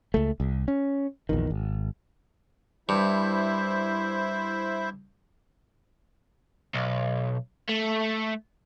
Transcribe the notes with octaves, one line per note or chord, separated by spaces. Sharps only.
C#2 A3
C2
C#4
A#1 E2 D#3
G#1
G2 E4 C5 E5
B1
A3